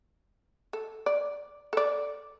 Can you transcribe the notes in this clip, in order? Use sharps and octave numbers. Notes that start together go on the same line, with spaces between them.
A4
D5
A4 D5